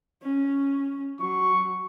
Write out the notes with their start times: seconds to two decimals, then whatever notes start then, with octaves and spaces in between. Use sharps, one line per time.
0.22 C#4
1.20 F#3 C#6